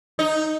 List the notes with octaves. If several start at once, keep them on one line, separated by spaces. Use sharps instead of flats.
D#4